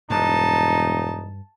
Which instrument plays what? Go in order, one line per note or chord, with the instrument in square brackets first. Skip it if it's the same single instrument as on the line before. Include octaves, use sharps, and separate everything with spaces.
[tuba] E1 [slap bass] G2 [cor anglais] D#4 [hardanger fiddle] A5